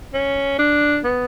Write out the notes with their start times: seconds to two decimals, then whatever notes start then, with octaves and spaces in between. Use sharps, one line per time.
0.14 C#4
0.59 D4
1.04 B3